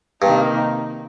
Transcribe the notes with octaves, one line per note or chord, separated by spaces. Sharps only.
G2 C3 D#3 A#3 D#4